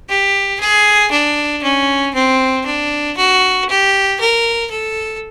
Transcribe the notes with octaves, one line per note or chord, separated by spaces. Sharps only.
G4
G#4
D4
C#4
C4
D4
F#4
G4
A#4
A4